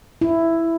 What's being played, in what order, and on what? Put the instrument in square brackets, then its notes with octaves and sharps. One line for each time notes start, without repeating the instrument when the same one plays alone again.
[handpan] E4